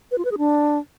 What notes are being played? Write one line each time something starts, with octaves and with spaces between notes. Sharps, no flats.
B4
F4
B4
G#4
D4